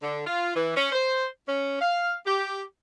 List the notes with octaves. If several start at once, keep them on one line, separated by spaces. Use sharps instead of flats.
D3
F4
E3
C#4
C5
C#4
F5
G4